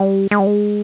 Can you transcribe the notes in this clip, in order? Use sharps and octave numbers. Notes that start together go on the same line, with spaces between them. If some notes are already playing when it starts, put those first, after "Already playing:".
Already playing: G3
G#3
G3
G#3